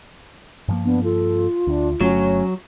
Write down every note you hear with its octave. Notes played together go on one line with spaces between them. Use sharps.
G2 F3 A#3
B3 D4
F4 A4
D2 D4
G1 D3 F#3 A3 C#4